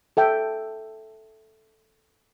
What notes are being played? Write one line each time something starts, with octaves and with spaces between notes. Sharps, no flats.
A4 E5 G5